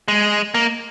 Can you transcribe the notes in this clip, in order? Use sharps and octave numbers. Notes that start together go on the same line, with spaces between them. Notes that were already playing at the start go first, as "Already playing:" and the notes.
G#3
A#3